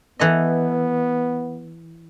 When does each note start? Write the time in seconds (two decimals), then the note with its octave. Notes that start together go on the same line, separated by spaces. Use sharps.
0.19 E3 B3 A4 D#5